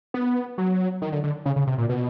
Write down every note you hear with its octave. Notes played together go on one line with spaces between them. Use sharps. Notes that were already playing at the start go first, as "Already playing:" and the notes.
B3
F#3
D#3
D3
D3
C#3
C#3
C3
A#2
B2